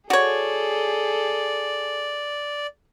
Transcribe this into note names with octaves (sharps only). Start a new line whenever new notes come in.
F#4 G#4 A4 C#5 D5